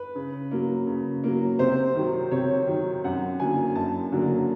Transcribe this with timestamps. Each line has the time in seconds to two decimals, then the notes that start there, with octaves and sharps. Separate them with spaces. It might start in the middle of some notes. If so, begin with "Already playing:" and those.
Already playing: B4
0.15 C#3
0.51 F#3 A#3
0.87 C#3
1.24 F#3 A#3
1.59 C3 C5
1.95 D#3 F#3
2.31 C3 C#5
2.67 D#3 F#3
3.04 F#2 F#5
3.40 D3 F#3 A#3 G#5
3.75 F#2 A5
4.12 D3 F#3 A#3